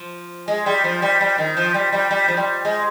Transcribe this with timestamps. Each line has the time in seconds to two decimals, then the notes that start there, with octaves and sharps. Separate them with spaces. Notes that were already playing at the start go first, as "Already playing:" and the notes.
Already playing: F3
0.48 G#3
0.66 G3
0.84 F3
1.02 G3
1.21 G3
1.38 D#3
1.57 F3
1.74 G3
1.93 G3
2.11 G3
2.28 F3
2.37 G3
2.65 G#3